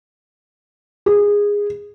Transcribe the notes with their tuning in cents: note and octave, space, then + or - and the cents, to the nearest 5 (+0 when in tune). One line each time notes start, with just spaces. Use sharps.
G#4 -15